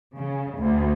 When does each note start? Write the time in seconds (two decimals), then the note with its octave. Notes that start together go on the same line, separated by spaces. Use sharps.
0.17 C#3
0.58 D2